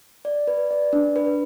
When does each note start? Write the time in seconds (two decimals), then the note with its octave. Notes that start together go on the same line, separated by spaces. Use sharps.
0.25 D5
0.47 B4
0.71 D5
0.93 D4
1.16 B4